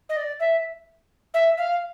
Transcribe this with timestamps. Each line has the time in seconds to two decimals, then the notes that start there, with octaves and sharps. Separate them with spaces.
0.09 D#5
0.17 D5
0.40 E5
1.34 E5
1.58 F5